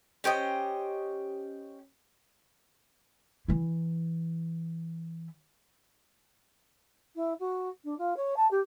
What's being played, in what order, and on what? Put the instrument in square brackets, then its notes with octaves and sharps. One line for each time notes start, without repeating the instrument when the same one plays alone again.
[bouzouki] C#4 G4 C5 D#5
[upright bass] E3 E4
[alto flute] E4
F#4
D4
F4
C#5
A5
G4